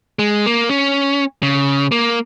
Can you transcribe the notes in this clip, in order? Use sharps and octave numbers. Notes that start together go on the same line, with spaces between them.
G#3
A#3
C#4
C#3
A#3